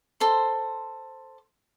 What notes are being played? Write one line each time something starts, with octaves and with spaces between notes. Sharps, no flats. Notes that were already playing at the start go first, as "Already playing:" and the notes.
A4 C5 C6